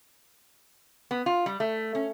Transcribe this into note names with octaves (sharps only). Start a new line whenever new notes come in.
B3
F4
G3
A3
C#4